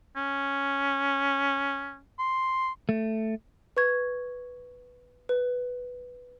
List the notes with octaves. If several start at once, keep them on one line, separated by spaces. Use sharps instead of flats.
C#4
C6
A3
B4 C#6 G#6
B4